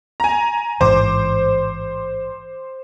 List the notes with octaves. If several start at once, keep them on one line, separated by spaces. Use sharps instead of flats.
G#5 A#5
A1 G#2 E3 C5 D6